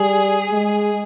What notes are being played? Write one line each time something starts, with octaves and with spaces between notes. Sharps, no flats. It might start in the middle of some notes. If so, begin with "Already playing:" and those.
Already playing: G3 G#4
G#3